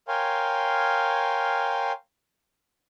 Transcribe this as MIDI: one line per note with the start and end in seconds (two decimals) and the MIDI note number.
0.08 1.92 70
0.08 1.92 73
0.08 1.92 77
0.08 1.92 79
0.08 1.92 80
0.08 1.92 84